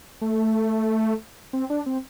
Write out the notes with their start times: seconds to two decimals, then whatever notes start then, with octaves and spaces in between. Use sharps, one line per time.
0.21 A3
1.53 C4
1.70 D4
1.86 C4